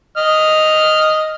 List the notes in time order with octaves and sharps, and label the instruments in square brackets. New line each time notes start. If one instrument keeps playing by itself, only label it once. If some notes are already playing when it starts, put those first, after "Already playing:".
[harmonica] D#5 F6